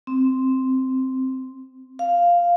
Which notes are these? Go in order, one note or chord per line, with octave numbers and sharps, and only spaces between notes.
C4
F5